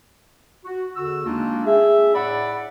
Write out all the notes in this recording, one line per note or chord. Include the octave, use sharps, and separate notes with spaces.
F#4
E2 D3 F#4 E6
G#3 A#3 D4 D#4 F4
G#4 E5
A2 D5 F#5 B5